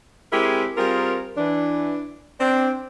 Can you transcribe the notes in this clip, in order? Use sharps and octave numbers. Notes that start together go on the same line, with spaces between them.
G#3 C4 E4 G4 G#4 A#4
G3 C4 F4 G#4 A#4
E3 D4
C4 D4